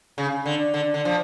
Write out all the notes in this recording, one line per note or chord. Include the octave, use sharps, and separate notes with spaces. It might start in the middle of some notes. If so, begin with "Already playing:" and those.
C#3
D3
D3
D3
F3